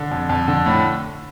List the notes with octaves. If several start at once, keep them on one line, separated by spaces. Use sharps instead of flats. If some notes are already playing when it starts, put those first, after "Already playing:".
Already playing: D3
F2
F2
D3
A2